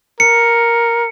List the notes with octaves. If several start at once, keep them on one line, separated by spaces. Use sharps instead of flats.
A#4 C#7